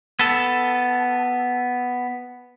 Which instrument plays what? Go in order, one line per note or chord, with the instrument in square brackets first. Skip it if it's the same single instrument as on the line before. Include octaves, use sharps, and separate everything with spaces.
[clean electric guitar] B3 A4